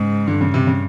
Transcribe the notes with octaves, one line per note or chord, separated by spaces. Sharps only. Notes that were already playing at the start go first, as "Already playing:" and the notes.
Already playing: G#2 C#3
G2 D3
C#3
C3
C#3